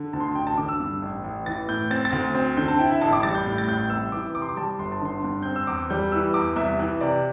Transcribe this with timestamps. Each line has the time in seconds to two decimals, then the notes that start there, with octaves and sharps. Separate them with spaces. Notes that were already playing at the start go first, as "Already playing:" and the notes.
Already playing: D3
0.13 D2 A5
0.20 C6
0.28 A5
0.35 A1 G5
0.47 A5
0.58 D3 D6
0.69 E6
0.80 G2
1.02 A1
1.24 A1
1.46 E3 A6
1.69 A2 G6
1.91 C4 A6
2.05 A6
2.12 D2
2.35 C4
2.57 D3 G6
2.68 A5
2.79 E4 G5
2.91 E5
3.01 A1 A5
3.13 D6
3.23 G3 A6
3.35 G6
3.46 A2 G6
3.58 A6
3.68 A1 G6
3.90 C2 E6
4.12 E3 D6
4.35 C3 D6
4.42 C6
4.49 D6
4.57 G3 A5
4.79 G1 C6
4.92 A5
5.02 D3 C6
5.24 G2
5.42 C4 G6
5.56 E6
5.67 E2 D6
5.90 G3 G6
6.12 E3 E6
6.34 E2 D6
6.56 C2 E5
6.79 E3
7.01 C3 D5